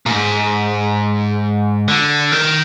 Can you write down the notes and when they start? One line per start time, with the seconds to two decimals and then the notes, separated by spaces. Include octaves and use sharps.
0.06 A#2
0.11 G#2
1.88 D3
2.32 D#3